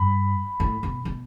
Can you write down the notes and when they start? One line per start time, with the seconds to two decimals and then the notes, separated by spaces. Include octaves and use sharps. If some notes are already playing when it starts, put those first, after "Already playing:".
Already playing: G2 B5
0.60 A2
0.83 B2
1.05 B2